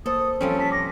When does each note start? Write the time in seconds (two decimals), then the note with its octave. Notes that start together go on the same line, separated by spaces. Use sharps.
0.06 A#3 A4 C5 D#6
0.41 F3 G3 C4 C#4 A4
0.59 A5 B6
0.72 D6 A#6